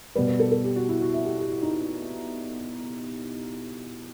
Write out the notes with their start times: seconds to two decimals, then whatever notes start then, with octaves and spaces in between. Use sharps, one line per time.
0.15 B2 G3 B4
0.28 B4
0.40 A4
0.52 A4
0.64 G4
0.76 F#4
0.89 E4
1.01 F#4
1.13 E5
1.25 G4
1.38 G4
1.50 E4
1.63 D#4